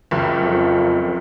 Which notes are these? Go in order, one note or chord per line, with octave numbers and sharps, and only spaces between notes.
F#1 C#2 F#2
F2